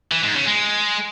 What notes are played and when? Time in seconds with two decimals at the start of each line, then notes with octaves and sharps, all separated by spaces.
0.12 E3
0.24 G#2
0.36 C#3
0.47 G#3